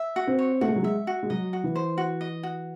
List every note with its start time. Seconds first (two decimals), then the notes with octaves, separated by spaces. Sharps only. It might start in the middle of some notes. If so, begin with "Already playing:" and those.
Already playing: E5
0.16 F#4
0.27 C4
0.39 C#5
0.61 A3 F#4
0.68 G#3
0.76 F#3
0.83 G#3 E5
1.07 F#4
1.23 G#3
1.30 F#3 D#5
1.53 F#4
1.64 E3
1.76 C5
1.98 F#4
2.21 D#5
2.43 F#4